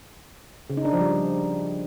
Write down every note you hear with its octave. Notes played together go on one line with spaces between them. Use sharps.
C#3
D#4
D4
F3
G3